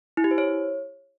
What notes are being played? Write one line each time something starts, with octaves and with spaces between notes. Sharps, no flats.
E4
G4
C5
C#5